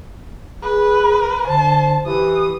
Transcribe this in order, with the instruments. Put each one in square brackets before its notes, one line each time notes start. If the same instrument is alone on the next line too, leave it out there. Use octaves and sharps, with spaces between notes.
[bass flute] G#4 [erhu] B4
[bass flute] D3 [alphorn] C5 [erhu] A5
[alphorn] E3 [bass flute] G4 [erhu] D#6